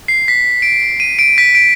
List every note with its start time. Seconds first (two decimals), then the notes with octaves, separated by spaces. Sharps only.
0.08 C7
0.28 B6
0.62 D7
1.00 D#7
1.19 D7
1.38 B6
1.55 D7